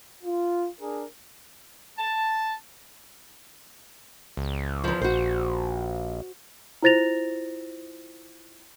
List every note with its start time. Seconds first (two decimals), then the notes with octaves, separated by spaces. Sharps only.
0.23 F4
0.81 D4 G#4 A#4
1.98 A5
4.37 C#2
4.84 E2 F3
5.01 A#1 F#4 C5
6.83 E4 F4 C5 A6 A#6 F7